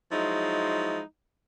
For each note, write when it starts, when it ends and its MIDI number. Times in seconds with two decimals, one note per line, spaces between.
0.11 1.00 53
0.11 1.00 54
0.11 1.00 56
0.11 1.00 63
0.11 1.00 64